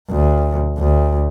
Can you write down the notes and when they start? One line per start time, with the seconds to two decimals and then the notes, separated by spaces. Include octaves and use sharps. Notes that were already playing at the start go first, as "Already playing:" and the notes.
0.10 D2
0.78 D2